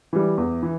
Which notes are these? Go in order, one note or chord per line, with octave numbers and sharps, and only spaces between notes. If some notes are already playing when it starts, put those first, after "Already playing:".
E3 G3
E2
E3